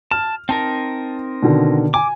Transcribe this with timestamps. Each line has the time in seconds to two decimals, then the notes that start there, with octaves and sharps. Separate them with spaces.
0.11 A5 F6
0.49 C4 D#4 A#4 A5
1.42 B2 D3 D#3
1.94 G#5 D6